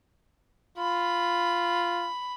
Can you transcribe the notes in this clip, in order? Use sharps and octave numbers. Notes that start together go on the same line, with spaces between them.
F4 B5